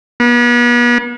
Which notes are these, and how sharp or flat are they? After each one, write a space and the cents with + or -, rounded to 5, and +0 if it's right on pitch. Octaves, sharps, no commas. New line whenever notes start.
B3 -40